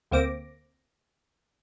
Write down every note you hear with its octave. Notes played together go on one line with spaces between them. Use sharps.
D2 A#3 C4 D6 A#6